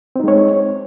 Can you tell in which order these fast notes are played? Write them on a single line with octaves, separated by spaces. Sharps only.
C4 D#4 G#3 C#5